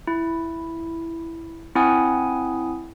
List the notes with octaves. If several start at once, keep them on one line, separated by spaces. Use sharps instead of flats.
E4
C4 E4 F#5 G#5 D#6